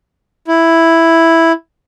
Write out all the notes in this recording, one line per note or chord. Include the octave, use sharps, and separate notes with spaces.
E4